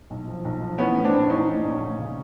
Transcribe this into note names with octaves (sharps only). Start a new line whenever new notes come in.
B1
F3
B1
F3
E3 B3 C#4
A2
C4 D4
A#1
E3 C#4 D#4
A2
A#1
D2
C#3